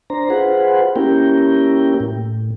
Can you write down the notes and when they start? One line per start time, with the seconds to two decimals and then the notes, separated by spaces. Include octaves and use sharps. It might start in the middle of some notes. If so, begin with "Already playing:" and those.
0.10 D4 C5 A#5
0.30 F4 G#4 B4 C5 F#5
0.96 A#3 C#4 E4 G4 A#4 G5
2.00 A2